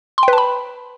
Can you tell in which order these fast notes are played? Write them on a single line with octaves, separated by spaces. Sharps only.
C6 G5 B4 A5 B5